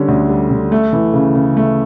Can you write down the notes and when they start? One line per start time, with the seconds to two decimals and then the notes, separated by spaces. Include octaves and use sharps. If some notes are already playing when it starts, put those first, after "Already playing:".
Already playing: D3 G3 C#4
0.08 D2
0.29 G3
0.50 D3
0.72 A3
0.93 E3
1.14 C#3
1.35 C#3
1.57 A3